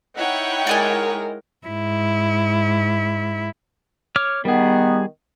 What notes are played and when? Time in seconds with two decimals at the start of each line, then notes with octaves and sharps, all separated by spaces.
0.16 D#4 E4 C#5 F#5 G5
0.67 G#3 A#4 D5 D#5 G#5
1.67 G#2 E4
4.16 C#5 D6 F6
4.45 D#3 G3 B3 G#4